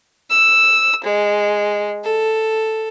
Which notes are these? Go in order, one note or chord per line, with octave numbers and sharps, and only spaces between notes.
E6
G#3
A4